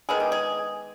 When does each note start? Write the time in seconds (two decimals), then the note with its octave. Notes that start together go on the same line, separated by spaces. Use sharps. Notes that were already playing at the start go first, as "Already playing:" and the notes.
0.09 D#3 G#3 B3 G#4
0.20 G4
0.32 G#4